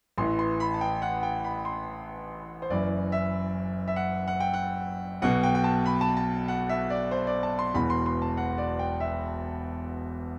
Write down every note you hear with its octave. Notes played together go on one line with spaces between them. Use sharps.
A1 A2 E3 C6
C6
B5
A5
G5
F#5
G5
B5
C6
C5
F#1 F#2 E3 D5
E5
E5
F#5
F#5
G5
F#5
B1 B2 F#5
G5
G5
A5
B5
A5
A5
F#5
E5
D5
C5
D5
A5
C6
E1 E2 B2 B5
C6
C6
A5
F#5
D5
G5
E5